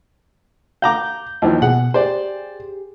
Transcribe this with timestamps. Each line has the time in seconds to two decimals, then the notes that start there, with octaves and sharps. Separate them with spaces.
0.82 F5 A#5 D6 G6
1.42 D#2 E3 F3
1.62 B2 G#4 F#5
1.94 G4 G#4 C5 D5